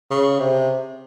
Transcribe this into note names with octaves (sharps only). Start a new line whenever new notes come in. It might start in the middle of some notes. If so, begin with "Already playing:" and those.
C#3
C3